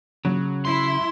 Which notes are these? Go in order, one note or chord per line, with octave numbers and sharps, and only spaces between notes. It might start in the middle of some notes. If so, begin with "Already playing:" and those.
C#3 F#3
E4 C6